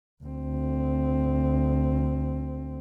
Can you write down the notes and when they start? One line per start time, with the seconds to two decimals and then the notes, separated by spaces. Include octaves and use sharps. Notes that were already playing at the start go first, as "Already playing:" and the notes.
0.24 D2 C4